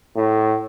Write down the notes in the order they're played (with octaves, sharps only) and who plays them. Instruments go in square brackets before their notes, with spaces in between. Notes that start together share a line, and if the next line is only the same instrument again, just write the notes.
[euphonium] A2